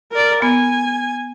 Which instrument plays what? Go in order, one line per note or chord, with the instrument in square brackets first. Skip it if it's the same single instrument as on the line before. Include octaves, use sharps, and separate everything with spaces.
[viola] A#4 D5
[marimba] B3 [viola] G#5